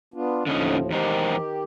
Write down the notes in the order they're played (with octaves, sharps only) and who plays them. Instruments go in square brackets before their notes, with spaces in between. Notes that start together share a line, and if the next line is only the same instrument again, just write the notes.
[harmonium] B3 D4 F4
[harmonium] D#2 A2 F3 [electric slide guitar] D3 C#4 D#4
[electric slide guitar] E2 D#4 C5 [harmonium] D#3 G4